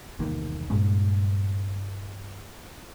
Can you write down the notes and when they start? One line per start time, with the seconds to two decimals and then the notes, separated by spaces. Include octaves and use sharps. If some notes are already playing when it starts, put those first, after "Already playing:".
0.19 E1 C2 D#3 A#3
0.70 G2 A#2 G#3 C#4